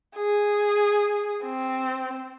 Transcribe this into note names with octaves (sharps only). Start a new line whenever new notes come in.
G#4
C4